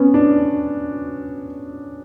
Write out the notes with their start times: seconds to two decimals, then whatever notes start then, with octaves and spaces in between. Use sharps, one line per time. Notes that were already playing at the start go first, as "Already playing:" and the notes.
Already playing: B3 C#4
0.14 D4